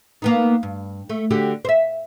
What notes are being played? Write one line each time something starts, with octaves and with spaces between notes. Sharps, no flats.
A#3 B3 D#4
G2
A3
D3 F#4 G4
C5 E5